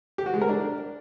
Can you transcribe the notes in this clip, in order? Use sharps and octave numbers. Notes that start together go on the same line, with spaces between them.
G4
F#4
G#3
A#4
D4